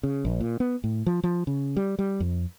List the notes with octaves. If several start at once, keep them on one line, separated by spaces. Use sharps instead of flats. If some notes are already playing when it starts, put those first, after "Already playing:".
C#3
A#1
A#2
B3
A2
F3
F3
C#3
G3
G3
F2